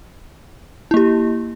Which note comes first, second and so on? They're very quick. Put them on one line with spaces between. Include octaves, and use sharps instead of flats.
E4 A#3 G4